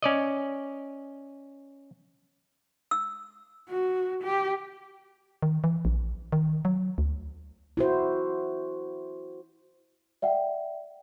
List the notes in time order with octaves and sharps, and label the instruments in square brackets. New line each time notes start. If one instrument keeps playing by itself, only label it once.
[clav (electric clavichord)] C#4 D5 D#5
[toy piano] E6
[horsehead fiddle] F#4
G4
[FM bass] D#3
E3
A#1
D#3
F#3
D2
[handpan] E4 F#4 C5
[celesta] D5 E5 F#5 G5